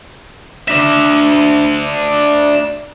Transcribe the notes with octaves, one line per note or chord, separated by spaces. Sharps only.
D4 E5